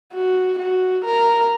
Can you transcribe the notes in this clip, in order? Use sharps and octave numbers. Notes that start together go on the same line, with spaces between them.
F#4
F#4
A#4